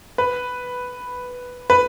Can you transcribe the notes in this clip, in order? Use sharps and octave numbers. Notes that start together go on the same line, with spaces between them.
B4
B4